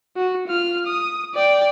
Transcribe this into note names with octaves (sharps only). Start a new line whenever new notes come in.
F#4
F4 F6
D#6
D5 G5